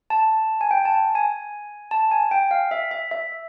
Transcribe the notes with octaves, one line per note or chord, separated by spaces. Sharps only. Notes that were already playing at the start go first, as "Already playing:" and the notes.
A5
G#5
G5
A5
G#5
A5
G#5
G5
F5
E5
E5
E5